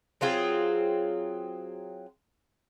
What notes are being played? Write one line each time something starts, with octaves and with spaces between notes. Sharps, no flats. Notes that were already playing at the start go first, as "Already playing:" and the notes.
F#3 C4 F4 G#4